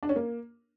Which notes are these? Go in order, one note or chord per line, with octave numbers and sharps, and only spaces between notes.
D4
C#4
A#3